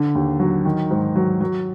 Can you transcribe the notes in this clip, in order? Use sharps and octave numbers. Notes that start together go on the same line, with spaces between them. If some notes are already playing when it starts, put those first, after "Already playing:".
Already playing: D3
D#2
F#3
D#3
G#2
F#3
F#3